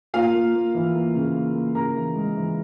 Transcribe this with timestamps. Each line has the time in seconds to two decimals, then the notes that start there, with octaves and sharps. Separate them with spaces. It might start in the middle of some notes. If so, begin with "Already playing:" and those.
0.14 A#3 F4 F5
0.34 A#3
0.54 A#3
0.75 E3
0.95 A#3
1.15 C#3
1.35 A#3
1.55 A#3
1.75 C#3 A#4 A#5
1.95 E3
2.16 G#3
2.36 E3